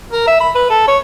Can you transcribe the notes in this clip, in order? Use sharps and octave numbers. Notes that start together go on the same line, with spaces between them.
A#4
E5
B5
B4
A4
C#5